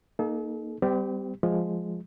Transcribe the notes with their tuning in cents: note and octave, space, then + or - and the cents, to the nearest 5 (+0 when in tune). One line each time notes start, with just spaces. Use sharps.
A#3 +0 D#4 -10 A4 -45
G3 +0 C4 -40 G4 +0
F3 +5 G#3 +0